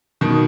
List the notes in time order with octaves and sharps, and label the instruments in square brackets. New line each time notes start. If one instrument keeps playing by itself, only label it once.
[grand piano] B2 D#3